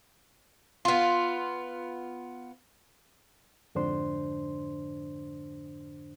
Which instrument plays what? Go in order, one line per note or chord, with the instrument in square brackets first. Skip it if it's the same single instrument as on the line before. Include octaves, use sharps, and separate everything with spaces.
[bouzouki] B3 F4
[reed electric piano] F2 G#2 D3 D4 C5 C6